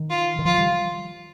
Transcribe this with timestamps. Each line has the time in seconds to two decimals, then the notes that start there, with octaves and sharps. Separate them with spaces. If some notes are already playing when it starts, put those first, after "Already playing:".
Already playing: D#3
0.10 F4
0.39 D#3
0.45 F3 F4
0.58 G3